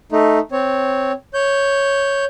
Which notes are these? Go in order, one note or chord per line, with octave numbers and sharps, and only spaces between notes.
A3 D#4
C4 C#5
C#5 G6